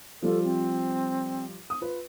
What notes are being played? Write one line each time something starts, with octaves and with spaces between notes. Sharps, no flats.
F3 G3 F4 A4
C4
D#6
F4 B4